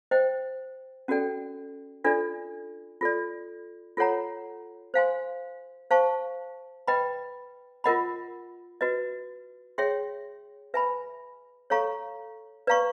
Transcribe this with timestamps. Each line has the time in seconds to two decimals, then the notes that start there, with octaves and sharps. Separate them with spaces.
0.11 C5 D#5 G5
1.08 C#4 F#4 A4 D5 G5
2.04 D4 F4 A4 D5
3.01 F4 A4 D5
3.97 F4 A4 C#5 F#5 A#5
4.94 C5 F5 G#5 C6
5.91 C5 F5 A5 C#6
6.88 B4 D#5 G5 B5
7.84 F4 A#4 D#5 F#5 B5
8.81 F#4 B4 D#5
9.78 G#4 C#5 E5 G5 C6
10.74 B4 E5 G#5 B5
11.70 A4 C#5 F5 A#5 C#6
12.67 B4 D5 F5 A#5 C#6